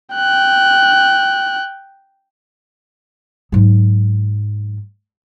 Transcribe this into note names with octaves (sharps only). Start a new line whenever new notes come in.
G5 F#6
G#2 F#3